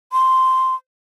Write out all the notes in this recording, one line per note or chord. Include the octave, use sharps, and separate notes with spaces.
C6